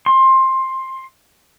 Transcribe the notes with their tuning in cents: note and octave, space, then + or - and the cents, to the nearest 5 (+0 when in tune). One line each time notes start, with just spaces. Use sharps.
C6 +15